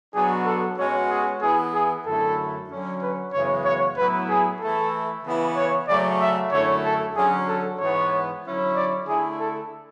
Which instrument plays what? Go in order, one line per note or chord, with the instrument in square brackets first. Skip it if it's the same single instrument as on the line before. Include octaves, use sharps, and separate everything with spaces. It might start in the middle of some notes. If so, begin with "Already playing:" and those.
[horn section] B2 F#3 B3 D4 F#4 [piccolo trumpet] G#4
[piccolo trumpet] A4
[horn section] B2 G#3 C#4 F#4 [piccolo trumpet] C#5
[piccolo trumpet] G#4
[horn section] E3 B3 E4 [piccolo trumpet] G#4
[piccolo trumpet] G#4
[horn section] F#2 D3 A3 E4 [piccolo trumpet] A4
[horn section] D3 F#3 C#4
[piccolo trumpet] B4
[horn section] F#2 C#3 E3 G#3 B3 [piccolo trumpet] C#5
[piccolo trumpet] C#5
[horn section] A2 F#3 B3 E4 [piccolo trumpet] B4
[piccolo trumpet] G#4
[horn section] E3 A3 E4 [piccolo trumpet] A4
[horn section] C#3 E3 B3 E4
[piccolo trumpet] C#5
[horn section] C#3 F#3 A3 [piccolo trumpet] D5
[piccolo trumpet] E5
[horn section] F#2 D3 A3 E4 [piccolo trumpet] C#5
[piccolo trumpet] A4
[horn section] D3 F#3 C#4 [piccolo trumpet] G#4
[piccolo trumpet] A4
[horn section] G#2 E3 B3 [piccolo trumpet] C#5
[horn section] D3 F#3 C#4 E4
[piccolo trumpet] D5
[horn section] D3 A3 E4 [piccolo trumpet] G#4
[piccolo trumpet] A4